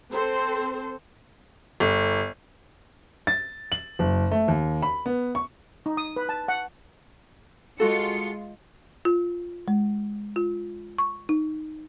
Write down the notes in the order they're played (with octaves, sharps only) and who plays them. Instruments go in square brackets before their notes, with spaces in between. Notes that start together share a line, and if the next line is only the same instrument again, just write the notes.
[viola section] C4 A4 C5
[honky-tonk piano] G1
[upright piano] A6
F#7
F#1
A3
D#2
B5
B3
C#6
[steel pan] D#4
D#6
B4
A5
F#5
[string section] G#3 F4 C#7 [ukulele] F#4 A4
[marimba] F4
G#3
F4
C#6
D#4